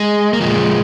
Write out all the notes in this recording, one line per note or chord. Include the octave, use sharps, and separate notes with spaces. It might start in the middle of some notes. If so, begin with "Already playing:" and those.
Already playing: G#3
A#3
A#2 F3 G#3